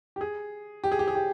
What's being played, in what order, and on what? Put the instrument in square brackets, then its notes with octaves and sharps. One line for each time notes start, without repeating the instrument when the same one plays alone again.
[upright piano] G4
G#4
G4
G#4
G4
G#4
G4